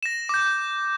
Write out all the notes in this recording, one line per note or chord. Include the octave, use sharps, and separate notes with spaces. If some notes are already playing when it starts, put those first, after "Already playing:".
A#6 E7
D6 G6